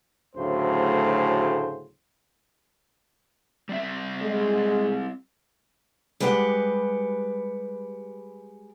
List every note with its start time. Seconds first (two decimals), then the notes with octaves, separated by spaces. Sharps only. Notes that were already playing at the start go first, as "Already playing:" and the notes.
0.36 D2 A2 C#3 F#3 C5
3.69 G3 C4 E5
4.22 G#3
6.20 G3 G#3 G4 B4 D#5 F#5